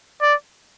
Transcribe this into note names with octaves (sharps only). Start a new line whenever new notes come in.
D5